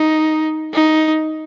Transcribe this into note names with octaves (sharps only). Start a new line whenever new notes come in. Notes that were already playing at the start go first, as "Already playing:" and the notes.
Already playing: D#4
D#4